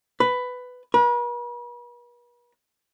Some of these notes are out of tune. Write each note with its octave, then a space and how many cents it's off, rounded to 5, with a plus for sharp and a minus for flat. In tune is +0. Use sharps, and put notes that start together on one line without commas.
B4 +10
B4 -45